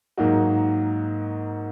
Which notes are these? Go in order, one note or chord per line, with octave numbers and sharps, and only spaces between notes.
G#2 F#3 A#3 D#4 F#4